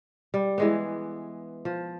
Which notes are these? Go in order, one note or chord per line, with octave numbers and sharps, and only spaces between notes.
G3
E3 G#3 B3
F3